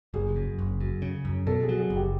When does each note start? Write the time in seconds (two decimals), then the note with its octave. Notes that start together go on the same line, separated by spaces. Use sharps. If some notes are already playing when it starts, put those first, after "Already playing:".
0.14 F#1 G#4
0.36 F#2
0.59 F#1
0.81 F#2
1.02 C#3
1.25 F#2
1.47 B2 A4
1.63 G#4
1.69 F#3
1.79 G#4
1.90 F#1
1.96 G4